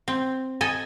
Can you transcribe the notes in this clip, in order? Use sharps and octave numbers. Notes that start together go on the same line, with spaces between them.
C4
A4 D#5 G#5